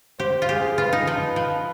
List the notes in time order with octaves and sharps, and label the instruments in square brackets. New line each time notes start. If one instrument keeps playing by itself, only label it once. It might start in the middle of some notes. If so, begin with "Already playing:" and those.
[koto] G4 [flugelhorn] C5
[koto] F4
[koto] G4 [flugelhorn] G#4
[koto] F4 [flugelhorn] B4
[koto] D#4
F3
F3